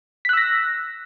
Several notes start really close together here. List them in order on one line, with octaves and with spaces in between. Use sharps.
B6 F#6 E6 A#6